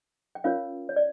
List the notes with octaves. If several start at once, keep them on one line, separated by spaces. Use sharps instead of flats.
G5
C#4 F4 A#4 C#5 F5
C#5
D5